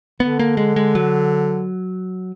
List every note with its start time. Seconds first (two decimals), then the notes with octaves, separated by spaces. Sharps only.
0.20 D3 B3
0.39 A#3
0.57 G#3
0.76 G#3
0.95 F#3